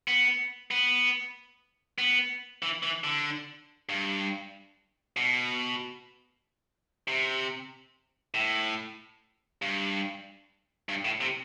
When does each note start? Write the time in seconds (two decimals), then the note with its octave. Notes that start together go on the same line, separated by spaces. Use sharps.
0.08 B3
0.71 B3
1.98 B3
2.62 E3
2.83 E3
3.04 D3
3.89 G2
5.17 B2
7.08 C3
8.34 A2
9.62 G2
10.89 G2
11.05 A2
11.21 C3